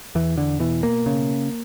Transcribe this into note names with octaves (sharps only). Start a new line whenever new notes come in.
E2 E3
D3
B2 E3
A#3
C#3